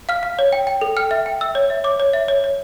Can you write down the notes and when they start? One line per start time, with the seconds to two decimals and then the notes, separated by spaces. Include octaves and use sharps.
0.09 F5 F6
0.23 F5
0.39 C#5
0.53 G5
0.67 G5
0.81 A4
0.97 G5 F6
1.11 E5
1.26 G5
1.41 E5 E6
1.55 C#5
1.70 E5
1.84 C#5 D6
2.00 C#5
2.13 E5
2.28 C#5
2.44 C#5